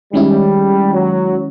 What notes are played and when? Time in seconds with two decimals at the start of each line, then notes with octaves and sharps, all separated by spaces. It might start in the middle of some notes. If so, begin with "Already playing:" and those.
0.13 D#3 G3 G#3 C#4 E4
0.94 F#3